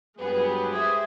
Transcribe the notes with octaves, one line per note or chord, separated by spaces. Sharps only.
G2 F#3 G#3 B3 G4 G#4 B4
G#4 C5 E5